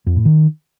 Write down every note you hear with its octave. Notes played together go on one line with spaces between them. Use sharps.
F2
A2
D#3